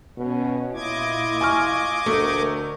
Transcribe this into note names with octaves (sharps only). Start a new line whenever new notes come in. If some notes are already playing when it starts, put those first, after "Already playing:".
B2 C#4
A#2 E4 F4 D#5 D6 G#6
G#5 C#6 F6
D2 A3 A#4